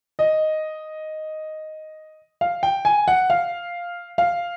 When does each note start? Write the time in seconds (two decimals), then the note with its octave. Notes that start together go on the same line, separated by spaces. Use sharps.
0.19 D#5
2.41 F5
2.63 G5
2.85 G#5
3.08 F#5
3.30 F5
4.18 F5